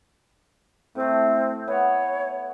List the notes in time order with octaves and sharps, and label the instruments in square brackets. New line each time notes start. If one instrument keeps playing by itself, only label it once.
[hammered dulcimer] A2 A3 [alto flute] C4
[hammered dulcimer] B3 [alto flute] C#5